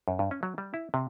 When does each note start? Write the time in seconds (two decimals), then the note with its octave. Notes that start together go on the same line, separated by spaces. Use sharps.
0.08 F#2
0.19 G2
0.31 C#4
0.43 F#3
0.58 G3
0.74 E4
0.94 C3